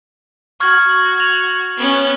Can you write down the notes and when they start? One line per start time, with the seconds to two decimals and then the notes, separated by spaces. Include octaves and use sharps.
0.60 F#4 C#6 F6 G#6
1.18 G#6 F7
1.77 B3 C#4